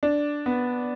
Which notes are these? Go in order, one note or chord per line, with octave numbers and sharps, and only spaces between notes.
D4
B3